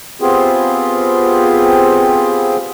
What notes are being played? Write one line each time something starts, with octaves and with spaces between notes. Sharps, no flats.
B3 C4 F4 G4 G#4